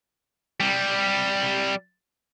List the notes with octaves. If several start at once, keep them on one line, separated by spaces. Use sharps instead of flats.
C3 G3